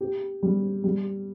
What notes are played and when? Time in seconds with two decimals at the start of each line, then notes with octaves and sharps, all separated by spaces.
0.01 G4
0.43 G3
0.84 G3